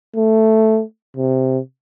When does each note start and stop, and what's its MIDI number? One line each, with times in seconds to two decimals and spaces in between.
0.16 0.82 57
1.17 1.59 48